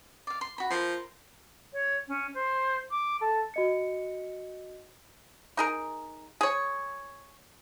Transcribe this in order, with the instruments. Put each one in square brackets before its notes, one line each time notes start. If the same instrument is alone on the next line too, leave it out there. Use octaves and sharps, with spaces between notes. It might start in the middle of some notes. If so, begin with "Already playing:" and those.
[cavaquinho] D5 F5
C6
F#4 B5
[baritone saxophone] F3 [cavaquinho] A#4 C6
[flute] C#5
C#4
C5
D6
A4
[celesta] F#4 D#5 C#7
[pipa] D#4 G#4 A#4
G#4 C#5